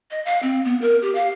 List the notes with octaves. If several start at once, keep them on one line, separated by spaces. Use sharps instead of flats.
D#5
F5
C4
B3
A#4
G4
F5